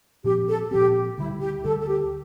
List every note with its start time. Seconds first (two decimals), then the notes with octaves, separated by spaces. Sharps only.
0.25 A#2 F3 C4 G4
0.48 A4
0.71 A#2 F3 C4 G4
1.18 D2 D3 G3 E4
1.41 G4
1.64 D2 D3 G3 A4
1.81 A4
1.87 G4